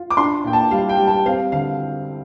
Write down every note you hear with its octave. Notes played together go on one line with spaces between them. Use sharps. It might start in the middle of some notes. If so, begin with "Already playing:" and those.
Already playing: F4
D6
D4 C6
A#2 G5
A5
G3 F5
G5
G3
A5
C4 F5
D3 F5